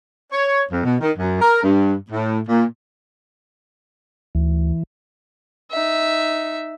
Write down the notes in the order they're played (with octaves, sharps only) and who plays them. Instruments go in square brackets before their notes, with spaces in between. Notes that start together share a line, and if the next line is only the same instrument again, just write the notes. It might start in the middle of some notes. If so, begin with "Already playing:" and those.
[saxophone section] C#5
F2
B2
D#3
F#2
A#4
G2
A2
A#2
[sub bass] D2 [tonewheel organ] E3
[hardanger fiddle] D#4 E5